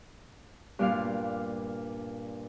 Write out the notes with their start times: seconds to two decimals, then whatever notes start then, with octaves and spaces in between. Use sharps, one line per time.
0.79 G2 A#2 F5